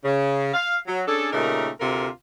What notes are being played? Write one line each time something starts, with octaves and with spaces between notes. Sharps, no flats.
C#3
F5
F#3
C#4 D4 G#4 A4
A#2 C#3 A3 D#4 G4 A#4
D2 C3 F4 A4 A#4